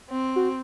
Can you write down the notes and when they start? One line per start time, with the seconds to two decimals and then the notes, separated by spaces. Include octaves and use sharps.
0.09 C4
0.36 F#4